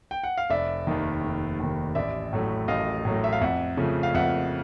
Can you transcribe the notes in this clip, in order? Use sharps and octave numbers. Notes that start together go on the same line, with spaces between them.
G5
F#5
F5
F1 D5 E5
D#2 D#3
F1
D#2 D#3
A1 D5 E5
A2 F#3 A3
A1 D#5 F5
A2 F#3 A3
E5
F5
F2 E5 F#5
C#3 F3 A3
F5
F2 E5 F#5